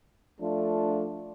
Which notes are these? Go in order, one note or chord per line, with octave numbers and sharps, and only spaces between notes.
F3 A3 D4 F4